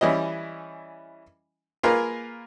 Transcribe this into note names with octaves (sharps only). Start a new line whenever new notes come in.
E3 G3 C#4 E4 D#5
A#3 F4 G#4 A#4 B4